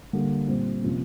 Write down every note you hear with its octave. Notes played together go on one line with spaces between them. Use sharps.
D3 G3 A#3 D4
A#2 G3 C4
C3 F3 A#3 C#4